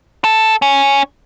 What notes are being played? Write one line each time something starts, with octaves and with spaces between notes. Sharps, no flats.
A4
C#4